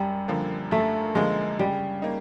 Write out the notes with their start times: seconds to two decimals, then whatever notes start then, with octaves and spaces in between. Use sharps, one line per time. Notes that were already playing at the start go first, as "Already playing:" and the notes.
Already playing: F#2 G3
0.28 D3 F3 A#3
0.71 F#2 A3
1.15 D3 F3 G#3 A#3
1.59 C#3 G3
2.02 A#3 D#4